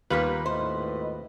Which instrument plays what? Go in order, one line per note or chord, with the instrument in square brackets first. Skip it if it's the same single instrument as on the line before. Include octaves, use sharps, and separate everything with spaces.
[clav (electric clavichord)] D#2 F4 [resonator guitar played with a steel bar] G3 A#3 B3 [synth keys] B4
[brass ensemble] G#1 A2 D#5 [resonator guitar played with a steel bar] C5